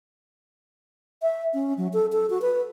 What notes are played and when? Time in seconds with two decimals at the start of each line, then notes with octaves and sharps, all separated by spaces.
1.22 E5
1.54 C#4
1.78 F#3
1.93 A4
2.12 A4
2.30 F#4
2.42 B4